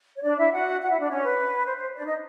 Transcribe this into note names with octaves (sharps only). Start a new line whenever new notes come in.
C#5
D4 D5
E4 E5
F#4 F#5
F#4 F#5
E4 E5
D4 D5
C#4 C#5
B4
C5
C5
D4 D5
D#4 D#5